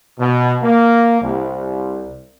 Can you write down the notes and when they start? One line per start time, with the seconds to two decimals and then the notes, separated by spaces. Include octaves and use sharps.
0.19 B2
0.63 A#3
1.22 C2